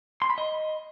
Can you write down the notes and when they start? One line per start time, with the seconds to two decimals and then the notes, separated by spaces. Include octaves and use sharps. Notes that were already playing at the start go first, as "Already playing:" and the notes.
0.22 C6
0.30 B5
0.38 D#5